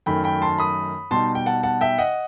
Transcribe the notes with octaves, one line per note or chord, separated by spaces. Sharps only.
F#2 D#3 A3 G5 B5
G5 B5
A5 C6
B5 D#6
B2 G3 D#4 A5 C6
G5
F#5 A5
F#5 A5
E5 G5
D#5 F#5